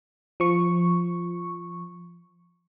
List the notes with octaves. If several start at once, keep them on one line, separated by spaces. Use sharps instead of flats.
F3 C#6